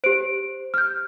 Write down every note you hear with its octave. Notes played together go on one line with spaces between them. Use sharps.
G4 C5 D7
F6
G6